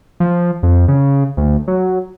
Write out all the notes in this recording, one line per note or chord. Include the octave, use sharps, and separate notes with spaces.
F3
F2
C#3
D2
F#3